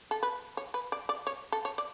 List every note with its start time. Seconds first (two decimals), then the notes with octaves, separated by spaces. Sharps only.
0.11 A4
0.23 B4
0.57 C#5
0.74 B4
0.92 D5
1.09 D5
1.27 C#5
1.52 A4
1.65 C#5
1.78 D5